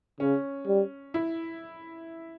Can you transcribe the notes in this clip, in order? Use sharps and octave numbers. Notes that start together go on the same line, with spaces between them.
C#3 C#4
G3
E4